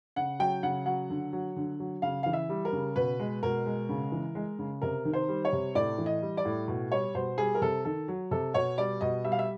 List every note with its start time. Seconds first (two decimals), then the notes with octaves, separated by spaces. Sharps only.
0.16 C#3 F#5
0.39 F#3 G5
0.63 C#3 F#5
0.86 F#3 F#5
1.10 D3
1.33 F#3
1.56 D3
1.80 F#3
2.02 C#3 F5
2.23 E3 F5
2.33 E5
2.49 G3
2.65 A#4
2.73 C#3
2.96 B2 B4
3.19 G#3
3.43 B2 A#4
3.66 G#3
3.89 C#3
4.12 E3
4.35 G#3
4.59 C#3
4.82 C3 A#4
5.05 D#3
5.13 C5
5.28 G3
5.45 C#5
5.53 C3
5.75 A2 D5
5.98 E3
6.06 D#5
6.22 G3
6.37 D5
6.45 A2
6.68 B2
6.92 G3 C#5
7.15 B2 C5
7.38 G3 G#4
7.55 A#4
7.62 C3 A4
7.85 D#3 A4
8.08 F#3
8.31 C3 A4
8.54 B2 C#5
8.78 G3 D5
9.01 B2 D#5
9.25 G3 E5
9.32 F5
9.39 E5